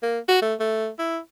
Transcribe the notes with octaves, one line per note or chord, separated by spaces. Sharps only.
A#3
F#4
A3
A3
E4